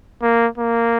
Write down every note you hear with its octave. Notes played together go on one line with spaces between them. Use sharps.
A#3
A#3